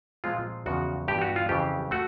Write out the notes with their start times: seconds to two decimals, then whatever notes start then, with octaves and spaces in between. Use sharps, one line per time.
0.24 A#2 F3 G#3 C4 F4
0.66 E2 C#3 F3 F#4
1.08 G2 E3 G#3 B3 G4
1.21 F#4
1.36 F4
1.49 F2 C#3 E3 G4
1.91 A3 F#4